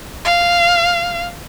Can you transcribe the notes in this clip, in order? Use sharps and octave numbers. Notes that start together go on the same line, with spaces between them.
F5